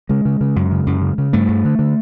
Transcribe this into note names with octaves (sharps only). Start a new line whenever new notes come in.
C#3 G#3
C#3
C#3
F#2
C#3
F#2
C#3
C#3
G2 A3
G2
D3
D3